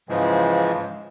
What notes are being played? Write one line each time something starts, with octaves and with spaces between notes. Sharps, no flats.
G#2 C#3 E3 F3 G#3